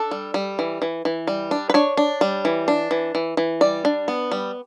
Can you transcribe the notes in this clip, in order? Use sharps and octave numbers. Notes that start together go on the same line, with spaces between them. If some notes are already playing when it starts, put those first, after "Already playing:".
Already playing: D4 A4
G3
G3
E3
E3
E3
G3
D4
B4
D4 C#5
D4
G3
E3
D4
E3
E3
E3
G3 D5
D4
B3
G3